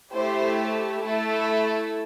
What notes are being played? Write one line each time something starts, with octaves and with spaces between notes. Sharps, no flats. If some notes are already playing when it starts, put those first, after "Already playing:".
A3 E4 G4 C5
A3 E4 A4